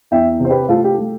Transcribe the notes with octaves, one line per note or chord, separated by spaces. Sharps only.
E2 E5 G5
C3 C5
G4 B4
A3 F4 A4
G4
A3